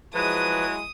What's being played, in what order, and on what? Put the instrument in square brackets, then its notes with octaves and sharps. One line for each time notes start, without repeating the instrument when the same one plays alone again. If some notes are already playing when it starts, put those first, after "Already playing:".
[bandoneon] F3 B4 [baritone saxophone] F#3 [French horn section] G#3 E4 [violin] D#6 D#7